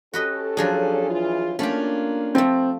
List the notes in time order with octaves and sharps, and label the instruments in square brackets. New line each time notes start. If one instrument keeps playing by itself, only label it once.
[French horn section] C#4 G4 A4 [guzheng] F#4 B4 D#5
[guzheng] F3 F#3 D4 [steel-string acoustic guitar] G#4
[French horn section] E3 F4
[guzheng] A3 G4 [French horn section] A#3 [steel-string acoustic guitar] C#4 D4 F4
[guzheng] F3 A3 [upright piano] C4